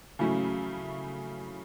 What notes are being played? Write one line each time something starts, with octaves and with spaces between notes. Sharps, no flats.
C#3 F#3 A3 C#4 E4